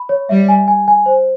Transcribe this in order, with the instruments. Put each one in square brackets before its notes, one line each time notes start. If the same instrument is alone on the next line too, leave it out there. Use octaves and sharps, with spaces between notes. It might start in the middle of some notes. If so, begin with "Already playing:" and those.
Already playing: [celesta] B5
C#5
[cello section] G3 [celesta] E5
[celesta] G#5
G#5
G#5
C5